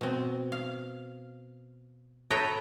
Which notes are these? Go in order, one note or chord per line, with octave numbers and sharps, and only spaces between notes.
B2 C4
F5
A4 B4 C#5 E5 G5 A#5